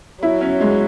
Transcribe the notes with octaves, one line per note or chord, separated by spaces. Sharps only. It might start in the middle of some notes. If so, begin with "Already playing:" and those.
F#3 E4
C#4
G#3